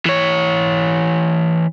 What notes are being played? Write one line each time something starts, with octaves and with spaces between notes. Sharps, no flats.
E3 C#5